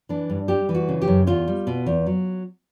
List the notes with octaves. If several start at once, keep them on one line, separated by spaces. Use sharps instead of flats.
E3 D4
G2
G3 G4
E3
F#4
C#3
G4
F#2
E2 F4
G3
B2
E2
F#3